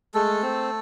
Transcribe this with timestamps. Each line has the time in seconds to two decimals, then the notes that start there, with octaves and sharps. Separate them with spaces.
0.14 G#3 A3 A4
0.42 C4